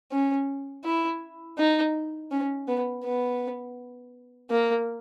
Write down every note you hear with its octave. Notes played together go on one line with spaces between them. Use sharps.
C#4
E4
D#4
C#4
B3
B3
A#3